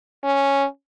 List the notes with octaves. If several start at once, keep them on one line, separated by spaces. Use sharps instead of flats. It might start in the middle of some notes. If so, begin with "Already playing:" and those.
C#4